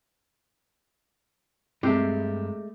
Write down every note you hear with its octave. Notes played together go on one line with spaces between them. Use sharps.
G2 C3 G#3 A3 G4